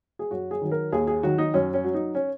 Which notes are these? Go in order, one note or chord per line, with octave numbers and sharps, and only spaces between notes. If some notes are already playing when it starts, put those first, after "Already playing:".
G#4
F#2 F#4
G#4
D#3 F#3
A#4
D#2 G#4
G#4
D#3 F#3 F#4
D#4
F#2 C#4
C#4
F#3
D#4
C#4